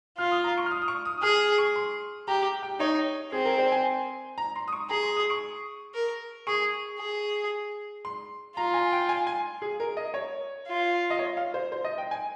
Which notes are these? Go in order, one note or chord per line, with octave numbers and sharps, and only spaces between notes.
F4 F6
D#6
A#5
C#6
F6
D#6
D#6
C#6
D#6
D#6
G#4 F6
C#6
C6
G4 A#5
G5
D#4 C#5
C4 G#4
A#4
C5
G#5
A#5
C6
D#6
C#6
G#4 A#5
C6
D#6
C#6
A#4
G#4 C#6
G#4
C6
F4 A#5
G#5
G5
G#5
G#5
G#4
A#4
D#5
C#5
F4
D#5
C#5
F5
C5
C5
D#5
G5
G#5